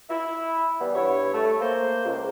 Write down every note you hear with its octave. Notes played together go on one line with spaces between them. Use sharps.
E4
E3 G3 B3
G2 E4 C#5
A3
A#3 C5
C#2